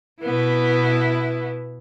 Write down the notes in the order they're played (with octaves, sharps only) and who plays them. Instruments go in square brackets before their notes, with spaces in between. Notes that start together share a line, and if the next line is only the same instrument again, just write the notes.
[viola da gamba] B2 B3 E4